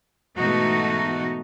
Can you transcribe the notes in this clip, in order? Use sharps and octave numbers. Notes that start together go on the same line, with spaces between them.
G#2 B2 E3 A3 D#4 F#4